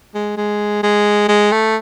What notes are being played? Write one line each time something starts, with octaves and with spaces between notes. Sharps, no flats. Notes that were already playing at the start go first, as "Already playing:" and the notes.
G#3
G#3
G#3
G#3
A3